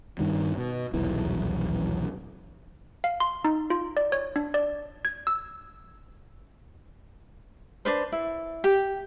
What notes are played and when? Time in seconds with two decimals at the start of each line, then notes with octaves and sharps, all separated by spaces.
0.19 G2 D#3 G3
0.58 B2
0.94 D#1 B1 E2 E3
3.04 F5
3.20 C6
3.45 D#4
3.70 F4
3.97 D5
4.12 C#5
4.36 D4
4.54 D5
5.05 G#6
5.27 E6
7.85 D4 B4 C5
8.12 E4
8.64 G4